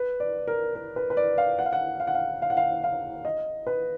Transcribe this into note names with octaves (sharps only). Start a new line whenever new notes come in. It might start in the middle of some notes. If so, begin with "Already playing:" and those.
Already playing: B4
D5
A#4
A#4
B4
B4
D5
F5
F#5
F5
F#5
F5
F#5
F5
F5
F#5
F5
F5
D#5
B4